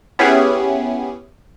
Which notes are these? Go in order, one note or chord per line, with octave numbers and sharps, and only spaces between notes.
B3 C#4 E4 G4 G#4